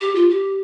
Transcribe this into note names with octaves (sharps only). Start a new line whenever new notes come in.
G4
F4
G4